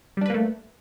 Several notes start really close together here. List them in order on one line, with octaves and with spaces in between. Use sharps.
G3 D4 B4 A#3 A3